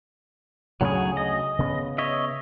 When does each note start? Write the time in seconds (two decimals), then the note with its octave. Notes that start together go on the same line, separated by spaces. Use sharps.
0.81 D2 C#3 F#3 A3 G#4
1.17 D#5
1.59 C#3 B3
1.98 C#5 D#5 E5